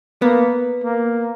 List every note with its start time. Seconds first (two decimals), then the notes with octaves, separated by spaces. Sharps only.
0.22 A#3 B3
0.84 A#3